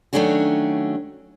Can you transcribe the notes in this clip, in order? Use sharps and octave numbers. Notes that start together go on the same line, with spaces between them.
D#3 F#3 A3 C#4 D4 F#4